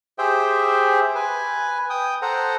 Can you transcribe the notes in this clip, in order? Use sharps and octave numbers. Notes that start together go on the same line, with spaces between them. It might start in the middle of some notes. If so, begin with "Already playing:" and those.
G4 G#4 C5 E5 G5
B4 G#5
G5 D#6
A4 C5 F#5 A#5